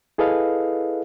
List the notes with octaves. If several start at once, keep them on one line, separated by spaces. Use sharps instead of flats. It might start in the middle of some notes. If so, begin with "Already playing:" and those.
E4 G#4 A4 B4 D#5 F5